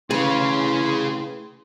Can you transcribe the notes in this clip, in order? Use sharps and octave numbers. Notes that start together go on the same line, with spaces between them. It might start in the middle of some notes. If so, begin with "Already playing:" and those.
A2 C#3 E3 C#4 E4 G#4 F5 C6